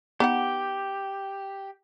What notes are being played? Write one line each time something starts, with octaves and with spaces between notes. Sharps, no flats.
B3 D#4 G4 F#5